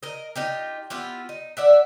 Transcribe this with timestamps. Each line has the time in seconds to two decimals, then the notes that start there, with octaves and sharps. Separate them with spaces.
0.03 A#4 D#5
0.36 D#4 F4 G4
0.90 B3 E4 F4 G4
1.29 D#4
1.57 D5 E5 F#5